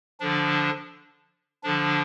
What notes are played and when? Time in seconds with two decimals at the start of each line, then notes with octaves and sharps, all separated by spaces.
0.20 D3 F3 D4
1.63 D3 F3 D4